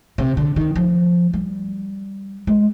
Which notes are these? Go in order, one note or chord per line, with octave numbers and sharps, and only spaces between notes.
C3
D3
D#3
F3
G3
G#3